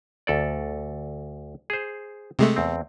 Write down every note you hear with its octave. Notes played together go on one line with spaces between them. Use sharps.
D2 A4 D5
G#4 C5
C3 G#3 A3
E2 C4